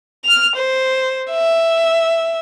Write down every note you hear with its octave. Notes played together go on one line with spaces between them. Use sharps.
F6 F7
C5
E5